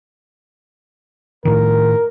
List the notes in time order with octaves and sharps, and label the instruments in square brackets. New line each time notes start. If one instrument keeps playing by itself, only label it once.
[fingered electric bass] A2 D#3 [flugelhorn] A#4